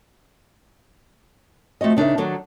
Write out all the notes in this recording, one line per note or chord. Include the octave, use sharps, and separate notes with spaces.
F3 A3 C4 F#4 D#5
C#3 D4 D#4 A#4 E5
D#3 F#3 D4 A4